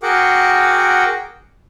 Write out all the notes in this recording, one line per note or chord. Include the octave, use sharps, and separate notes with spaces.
F#4 G#4 A#4 F#5 G5 D6